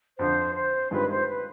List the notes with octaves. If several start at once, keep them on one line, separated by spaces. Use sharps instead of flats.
F2 D3 F3 C5
C5
G2 D#3 G#3 C4 F4 B4
C5
B4